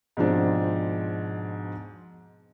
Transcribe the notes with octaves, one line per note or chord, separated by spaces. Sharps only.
G#2 B2 F3 C4 D4